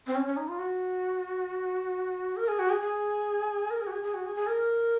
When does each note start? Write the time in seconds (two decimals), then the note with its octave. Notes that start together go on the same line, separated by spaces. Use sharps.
0.07 C4
0.15 C#4
0.26 C#4
0.37 D#4
0.49 F4
0.59 F#4
2.37 A#4
2.48 G#4
2.59 F#4
2.70 G#4
2.81 G#4
3.70 A#4
3.81 G#4
3.87 F#4
3.92 G#4
4.03 G#4
4.14 F#4
4.26 G#4
4.36 G#4
4.47 A#4